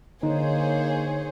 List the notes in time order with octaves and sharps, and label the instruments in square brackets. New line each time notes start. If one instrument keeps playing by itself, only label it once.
[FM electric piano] D3 [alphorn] A#3 [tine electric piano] D#4 [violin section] G#4 C5 C#5